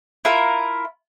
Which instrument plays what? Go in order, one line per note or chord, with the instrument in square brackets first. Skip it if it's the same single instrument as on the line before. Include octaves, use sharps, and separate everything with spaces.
[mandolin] E4 F4 A#4